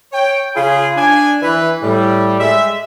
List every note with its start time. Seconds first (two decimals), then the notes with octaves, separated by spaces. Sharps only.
0.13 C#5 G5
0.56 C#3 F4 G#4 B5
0.97 D4 G#5
1.42 E3 B4
1.83 A2 G3
2.39 G#3 E5